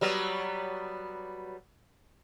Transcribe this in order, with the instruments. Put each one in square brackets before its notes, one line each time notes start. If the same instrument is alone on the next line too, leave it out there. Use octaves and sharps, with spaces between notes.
[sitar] F#3 G3 B3